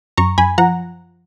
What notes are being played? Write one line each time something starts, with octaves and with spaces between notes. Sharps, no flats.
F#2 A#5 C#6
F#2 G#5 B5
F3 F#5 A#5